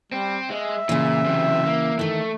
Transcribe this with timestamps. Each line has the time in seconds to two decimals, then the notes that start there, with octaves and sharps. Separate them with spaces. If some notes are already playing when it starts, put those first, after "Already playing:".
0.12 G3 C4
0.50 G#3 E5
0.89 A#2 C#3 E3
1.26 C3 F#3
1.66 A#3
1.99 D#3 E3 A3